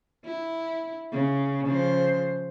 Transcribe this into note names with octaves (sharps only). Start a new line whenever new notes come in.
E4
C#3
C#3 F3 C5